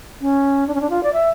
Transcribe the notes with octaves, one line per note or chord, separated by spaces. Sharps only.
C#4
D4
C#4
D4
F4
D5
E5